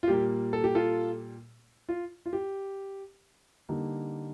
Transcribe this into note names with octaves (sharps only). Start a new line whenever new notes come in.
F4
A#2 G3 A#3 G4
A4
G4
F4 A4
F4
F4
G4
D3 G3 A#3 D#4